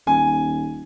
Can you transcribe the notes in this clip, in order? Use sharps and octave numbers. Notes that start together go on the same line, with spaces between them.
D#1 G#5